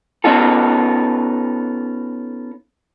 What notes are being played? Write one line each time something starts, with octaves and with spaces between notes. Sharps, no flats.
B3 C#4 D#4 F4 A4